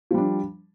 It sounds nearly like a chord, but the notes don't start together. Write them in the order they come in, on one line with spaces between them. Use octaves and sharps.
F3 G3 D4